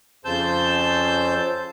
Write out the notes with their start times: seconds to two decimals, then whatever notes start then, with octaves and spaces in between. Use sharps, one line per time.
0.25 F2 C#3 C5 A5 E6 G6